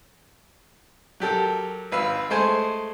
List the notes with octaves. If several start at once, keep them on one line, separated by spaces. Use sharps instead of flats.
F#3 G4 A4 A#4
G#1 B4 F5 E6
G#3 A3 C5 G#5